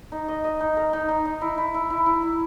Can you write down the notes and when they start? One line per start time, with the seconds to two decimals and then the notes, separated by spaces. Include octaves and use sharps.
0.12 D#4
0.28 D#5
0.44 D#5
0.60 D#4
0.77 A#4
0.93 D#4
1.08 D#4
1.25 D#4
1.41 E4
1.58 E4
1.74 E4
1.90 E4
2.06 E4
2.22 E4